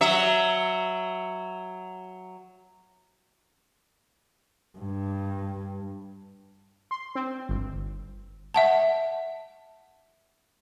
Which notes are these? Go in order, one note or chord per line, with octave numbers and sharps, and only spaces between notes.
F#3 E5
G2
C6
C4
G1
E5 F#5 A5